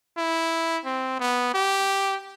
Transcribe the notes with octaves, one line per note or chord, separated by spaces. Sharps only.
E4
C4
B3
G4